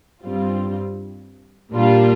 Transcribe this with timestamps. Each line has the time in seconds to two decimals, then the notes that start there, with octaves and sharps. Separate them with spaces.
0.23 G2 G3 C4 F4
1.74 A#2 G3 A#3 D4 F4